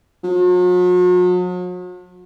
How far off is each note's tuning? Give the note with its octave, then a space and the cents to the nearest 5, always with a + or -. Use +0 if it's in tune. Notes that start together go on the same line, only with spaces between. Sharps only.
F#3 -45